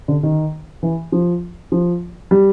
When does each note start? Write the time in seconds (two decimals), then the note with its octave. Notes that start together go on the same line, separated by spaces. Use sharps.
0.08 D3
0.23 D#3
0.83 E3
1.12 F3
1.72 F3
2.31 G3